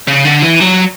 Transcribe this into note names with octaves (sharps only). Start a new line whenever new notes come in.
C#3
D3
E3
F#3